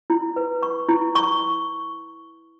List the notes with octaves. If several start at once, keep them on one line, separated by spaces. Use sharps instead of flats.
E4
B4
C#6
E4
C#6